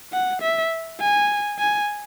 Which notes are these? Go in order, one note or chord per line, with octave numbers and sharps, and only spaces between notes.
F#5
E5
G#5
G#5